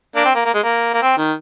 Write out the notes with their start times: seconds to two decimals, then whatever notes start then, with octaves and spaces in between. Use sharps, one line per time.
0.16 A#3 D4
0.25 C4
0.35 A#3
0.45 A#3
0.54 G#3
0.64 A#3
0.94 A#3
1.03 C4
1.18 D#3